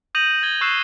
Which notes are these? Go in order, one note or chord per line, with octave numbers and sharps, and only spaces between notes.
D#6 G6 A#6 D#7 F7 F#7
G6 G#6 G7
C#6 E6 F#6 C7 E7